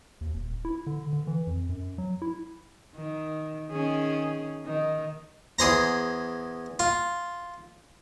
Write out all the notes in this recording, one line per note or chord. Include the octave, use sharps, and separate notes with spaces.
D#2
D#1
E4
D3
D3
E3
F2
F#2
F#3
E4
D#3
D#3 C#4 G#4
D#3 D#4
E2 G#4 C5 A#5
F4